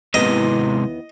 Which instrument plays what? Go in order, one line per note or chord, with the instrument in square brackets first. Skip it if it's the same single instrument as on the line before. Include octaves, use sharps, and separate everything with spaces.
[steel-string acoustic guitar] D#2 E3 B3 [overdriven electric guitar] G#2 C3 [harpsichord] D#5